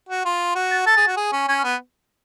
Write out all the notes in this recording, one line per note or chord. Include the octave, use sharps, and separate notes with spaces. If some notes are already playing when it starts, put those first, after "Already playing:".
F#4
F4
F#4
A6
A4 A6
G#4
F#4
G#4
C#4
C#4 G#6
F6
B3